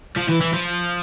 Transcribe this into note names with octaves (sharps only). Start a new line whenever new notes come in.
F3
E3
E3
F3